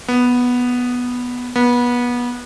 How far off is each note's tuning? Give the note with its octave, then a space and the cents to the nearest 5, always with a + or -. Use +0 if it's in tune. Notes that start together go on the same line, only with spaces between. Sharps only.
B3 -5
B3 -25